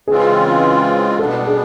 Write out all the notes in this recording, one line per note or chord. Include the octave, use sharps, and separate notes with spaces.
C#3 E3 G#3 C4 F4 G#4
B2 G3 B3 D4 A4
G#4